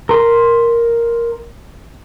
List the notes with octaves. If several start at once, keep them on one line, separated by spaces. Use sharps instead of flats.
A#4 C6